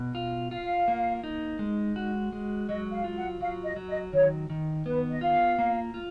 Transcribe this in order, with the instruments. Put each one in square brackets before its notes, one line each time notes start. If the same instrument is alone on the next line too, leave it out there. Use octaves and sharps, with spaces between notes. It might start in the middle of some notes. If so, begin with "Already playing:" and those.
Already playing: [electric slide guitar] B2
F4
[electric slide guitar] F4 [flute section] F5
[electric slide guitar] A#3
D#4
G#3
F#4
G#3
[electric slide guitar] F#3 [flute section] D#5
[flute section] F5
[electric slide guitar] F4
[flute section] F#5
[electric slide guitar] F#3 [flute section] F5
[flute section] D#5
[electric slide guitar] F#3
[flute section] D#5
[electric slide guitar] D#3 [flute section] C#5
[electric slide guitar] D#3
[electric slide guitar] B3 [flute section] B4
[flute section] D#5
[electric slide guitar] F4 [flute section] F5
[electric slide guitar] A#3
F4